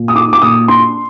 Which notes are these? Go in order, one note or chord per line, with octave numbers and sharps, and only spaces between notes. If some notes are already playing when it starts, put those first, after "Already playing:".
Already playing: A#2
D#6
D#4 D6
D6
A#2 D#6
D4 C6